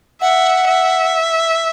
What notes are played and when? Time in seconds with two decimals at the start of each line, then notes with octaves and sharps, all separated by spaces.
0.21 E5 F#5
0.67 E5